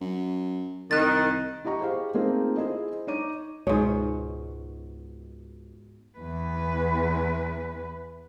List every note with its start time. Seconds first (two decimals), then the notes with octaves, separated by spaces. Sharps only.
0.01 F#2
0.91 C2 D#3 F#6 A6
1.65 E4 G4 D#5 A#5 C#6
1.80 G4 G#4 C5 F5
2.14 A3 A#3 C4 D#4 F4 G#4
2.57 E4 G#4 C5 D#5
3.07 D#4 C#5 D6 D#7
3.67 C#2 G#2 B2 C#5
6.18 E2 B4